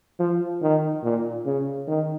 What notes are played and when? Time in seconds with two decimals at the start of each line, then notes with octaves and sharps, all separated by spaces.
0.20 F3
0.62 D#3
1.03 A#2
1.46 C#3
1.87 D#3